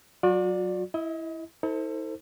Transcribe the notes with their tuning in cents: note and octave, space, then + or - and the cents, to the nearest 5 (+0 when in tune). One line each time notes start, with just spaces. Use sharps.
F#3 +0 F#4 -40 D5 +0
E4 +0 D#5 +35
E4 -45 A4 +25 C5 +0